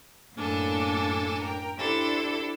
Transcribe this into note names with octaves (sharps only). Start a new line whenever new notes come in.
F#2 A2 A#3 D4 A4 G#5
A#4 G5
D4 E4 G4 A4 C5